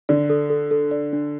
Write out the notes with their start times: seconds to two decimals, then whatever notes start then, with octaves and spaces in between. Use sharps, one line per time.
0.09 D3 D5
0.30 A4
0.50 A4
0.71 A4
0.91 D5
1.13 D4